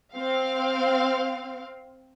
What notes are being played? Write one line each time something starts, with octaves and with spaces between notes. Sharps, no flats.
C4 F5